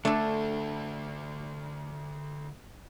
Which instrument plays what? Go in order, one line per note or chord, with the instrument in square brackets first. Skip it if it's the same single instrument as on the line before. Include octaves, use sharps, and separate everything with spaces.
[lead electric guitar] D3 F#4 [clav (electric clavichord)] A3 [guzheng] D4 A4